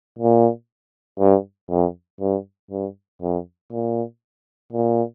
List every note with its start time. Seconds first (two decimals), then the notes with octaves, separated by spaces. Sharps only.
0.19 A#2
1.20 G2
1.70 F2
2.20 G2
2.71 G2
3.22 F2
3.72 A#2
4.72 A#2